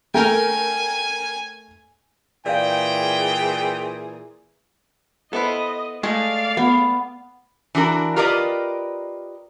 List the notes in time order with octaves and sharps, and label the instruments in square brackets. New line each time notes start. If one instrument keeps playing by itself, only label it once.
[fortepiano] A3 A4 [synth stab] A#4 G5 [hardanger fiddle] G#5
[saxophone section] A#2 E3 G#4 [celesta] D5 F5 [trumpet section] G5
[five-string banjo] B3 E4 B4 [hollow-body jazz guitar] A4 C5 [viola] D#5
[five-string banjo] G#3 G#4 [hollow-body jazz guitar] A3 [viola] D5 F5
[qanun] B3
[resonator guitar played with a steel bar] E3 D4 F#4 A#4
F4 G4 A#4 B4 D5 D#5